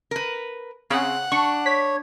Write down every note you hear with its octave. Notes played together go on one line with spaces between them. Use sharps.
A#4 B4
C#3 C4 F#5
D4 C#6
C#5 B6